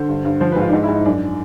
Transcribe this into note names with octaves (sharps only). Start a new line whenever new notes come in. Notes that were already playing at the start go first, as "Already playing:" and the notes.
Already playing: D3 C5
G2
G2
F3 C5
G#2 B4
F4
D4
G#2 D#4
E4
G#2
D#4
F#2 D4